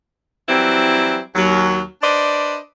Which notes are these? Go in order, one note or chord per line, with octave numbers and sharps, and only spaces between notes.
E3 F#3 G3 C4 E4
D#2 F#3
D4 B4 C5 D5 D#5